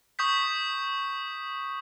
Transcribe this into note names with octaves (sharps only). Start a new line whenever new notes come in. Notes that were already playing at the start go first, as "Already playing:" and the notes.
C#6 D#6 G6 B6